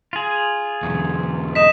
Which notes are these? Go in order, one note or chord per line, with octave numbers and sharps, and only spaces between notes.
F4 G#4
B1 E2
D#5 B6 E7